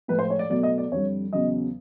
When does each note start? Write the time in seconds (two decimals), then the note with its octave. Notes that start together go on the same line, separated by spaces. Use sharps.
0.08 A2 F3 G#3 B4
0.19 C5
0.30 C#5
0.39 D5
0.50 B2 F#3 A3 D5
0.63 D#5
0.78 D5
0.91 F2 D3 G3 C#5
1.33 E2 C#3 F#3 D#5